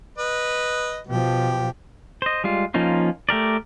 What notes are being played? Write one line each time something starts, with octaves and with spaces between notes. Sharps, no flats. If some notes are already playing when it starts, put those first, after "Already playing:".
B4 D#5
B2 F3 G4
C5 D#5
G3 G#3 F4
F3 A#3 C#4 D#4 F4
A3 G4 A#4 D5